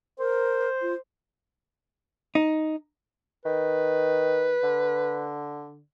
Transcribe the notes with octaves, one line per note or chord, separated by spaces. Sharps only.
A#4 C5
F4
D#4
D#3 B4
D3